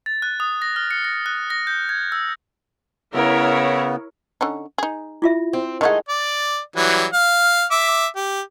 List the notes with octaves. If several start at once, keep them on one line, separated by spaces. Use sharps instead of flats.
A6
F#6
D#6
A#6
F6
C#7
A#6
F#6
A#6
G6
G#6
E6
C#3 B3 E4 A#4 C#5
D3 C#4 D#4
D#4 G#4
E4 F4 E5
C4
D#3 G#3 A3 D#4 F#5
D5
E3 F#3 G3
F5
E5 D6
G4